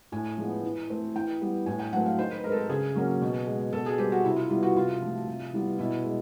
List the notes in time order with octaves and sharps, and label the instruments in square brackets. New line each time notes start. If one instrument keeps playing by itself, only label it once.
[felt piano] A2 G#5
F3 G#3 B3
E3
A3 C4
E3 G5
G3 B3
A2 G#5
G5
F#3 A3 C4 F#5
F5
D#3 C5
B4
G#3 C4 A#4
A4
A#4
C#3 G#4
F#3 A#3 C#4
B2
G#3 B3
B2 A4
G#4
G3 C4 G4
F#4
C3 E4
F4
E3 G3 B3 F4
F#4
C3 F4
F3 A3
C3
E3 G3 B3
B2 E4
G#3